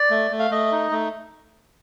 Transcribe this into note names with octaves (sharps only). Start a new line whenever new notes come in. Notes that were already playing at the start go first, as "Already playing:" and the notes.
Already playing: D5
A3
A3
F5
A3 D#5
D#4
A3